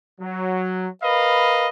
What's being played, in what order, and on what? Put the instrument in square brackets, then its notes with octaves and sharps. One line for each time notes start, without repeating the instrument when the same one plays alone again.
[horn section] F#3
A#4 B4 D#5 F5 B5